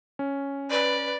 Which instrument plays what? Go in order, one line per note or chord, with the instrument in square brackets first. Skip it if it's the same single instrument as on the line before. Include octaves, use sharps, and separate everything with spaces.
[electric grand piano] C#4
[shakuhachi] B4 [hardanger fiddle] D5